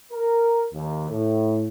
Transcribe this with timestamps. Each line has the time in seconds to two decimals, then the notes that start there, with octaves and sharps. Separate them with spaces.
0.12 A#4
0.73 D#2
1.11 A2